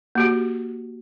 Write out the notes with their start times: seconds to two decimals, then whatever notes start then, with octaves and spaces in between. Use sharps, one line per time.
0.15 A#3 F#4 G4